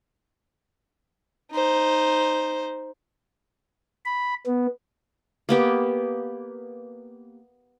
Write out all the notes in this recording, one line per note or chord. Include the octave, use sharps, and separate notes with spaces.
D#4 C5
B5
B3
A#3 B3 G4